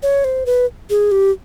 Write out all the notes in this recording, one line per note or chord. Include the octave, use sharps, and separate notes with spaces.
C#5
C5
B4
G#4
G4